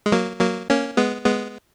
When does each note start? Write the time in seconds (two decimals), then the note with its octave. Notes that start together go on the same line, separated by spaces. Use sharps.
0.06 G#3
0.12 F#3 A#3
0.41 F#3 A#3
0.69 A#3 C#4
0.97 G#3 B3
1.26 G#3 B3